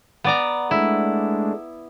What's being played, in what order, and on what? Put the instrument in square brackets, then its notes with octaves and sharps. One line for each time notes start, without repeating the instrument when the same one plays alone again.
[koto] B3 D5 A#5
[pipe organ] G#3 A3 D4 [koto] E4